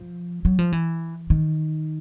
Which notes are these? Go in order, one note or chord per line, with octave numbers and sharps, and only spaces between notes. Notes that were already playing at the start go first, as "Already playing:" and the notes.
Already playing: F3
F#3
F3
E3
D#3